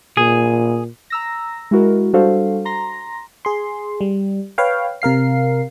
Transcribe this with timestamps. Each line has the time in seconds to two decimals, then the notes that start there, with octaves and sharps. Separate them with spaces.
0.17 A#2 G#4
1.10 A#5 E6 A#6
1.71 G#3 E4 F#4 A#4
2.13 G3 D4 F#4 A4 C5 F5
2.65 A#5 C6 A#6
3.45 G#4 C6
4.01 G3
4.58 B4 C#5 F5 G5
5.02 C3 A#4 F5 C7